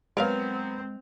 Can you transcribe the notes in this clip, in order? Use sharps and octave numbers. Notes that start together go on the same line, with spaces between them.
F#3 G#3 B3 C4 A#4 C#5 F5 F7